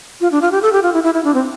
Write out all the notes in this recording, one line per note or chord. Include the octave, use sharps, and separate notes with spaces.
F4
D4
F4
G4
A4
G4
F4
E4
E4
E4
D4
C4